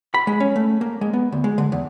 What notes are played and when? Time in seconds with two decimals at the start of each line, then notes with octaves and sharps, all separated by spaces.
0.14 B5
0.27 G#3
0.40 C#4
0.56 A3
0.81 A#3
1.01 G#3
1.13 B3
1.32 D2
1.44 G#3
1.58 D3
1.72 E2